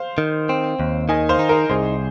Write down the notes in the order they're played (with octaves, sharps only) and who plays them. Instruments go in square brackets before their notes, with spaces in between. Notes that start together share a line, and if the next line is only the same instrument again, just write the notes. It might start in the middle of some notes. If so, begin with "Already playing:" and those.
Already playing: [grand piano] C5 F5
[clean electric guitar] D#3
C4
D#2
[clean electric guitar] D#3 [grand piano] D#5 G#5
[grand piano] C5 F5
[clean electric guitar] D#4
[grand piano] A#4 D#5
[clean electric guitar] C2 [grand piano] G#4 C5